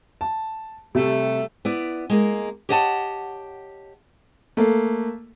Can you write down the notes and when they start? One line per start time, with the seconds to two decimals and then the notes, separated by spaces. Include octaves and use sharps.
0.21 A5
0.95 C3 G3 A3
1.65 B3 E4 D5
2.10 G#3 A#3 G#4
2.69 G4 C#5 D#5 F#5 G#5 A5
4.57 A3 A#3